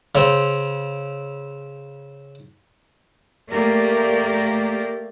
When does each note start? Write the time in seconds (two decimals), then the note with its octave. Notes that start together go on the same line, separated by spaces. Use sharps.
0.15 C#3 C4
3.51 A3 A#3 G4 A#4 D5